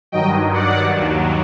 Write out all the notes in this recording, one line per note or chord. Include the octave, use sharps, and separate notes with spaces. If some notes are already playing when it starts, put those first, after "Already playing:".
G2 D#3 F#3 D#5 G5
D5 F#5
D#2 D#3 F#3